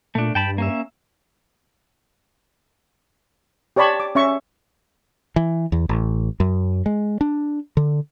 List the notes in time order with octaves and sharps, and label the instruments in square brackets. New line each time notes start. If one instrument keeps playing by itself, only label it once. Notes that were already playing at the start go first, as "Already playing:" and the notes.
[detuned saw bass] A#2 [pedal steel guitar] A3 D4
[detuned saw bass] G2 [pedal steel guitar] G5 A5 B5
[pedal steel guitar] A#3 C#4 E5
[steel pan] G4 C#5 D5 A5 B5 C#6
D6
C#4 E5 C#6
[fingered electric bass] E3
E2
A1
F#2
G#3
D4
D3